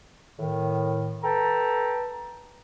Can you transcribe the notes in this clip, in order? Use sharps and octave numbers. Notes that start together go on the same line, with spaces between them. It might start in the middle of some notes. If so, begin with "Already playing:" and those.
A2 D#3
A4 B4 G5 A5 A#5